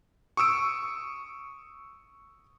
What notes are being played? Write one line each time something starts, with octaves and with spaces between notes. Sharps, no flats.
C#6 D#6 E6 D7